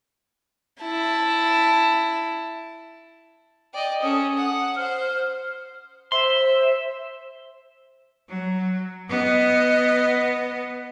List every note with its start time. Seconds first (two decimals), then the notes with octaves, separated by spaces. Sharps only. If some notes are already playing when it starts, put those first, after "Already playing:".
0.82 E4 A5
3.74 D5 D#5 G5
4.02 C#4 A4 D#6
4.36 F#5
4.76 C5 F6
6.12 C5 E5 C6
8.28 F#3
9.08 B3 D#5